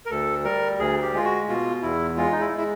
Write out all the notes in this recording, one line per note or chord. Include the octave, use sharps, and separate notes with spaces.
A#4
D2 A4
G3 A#4
D2 G#4
G4
G#3 F4
F#4
B2 F4
E2 E4
G#3 F4
D#4
E4
G#3
E4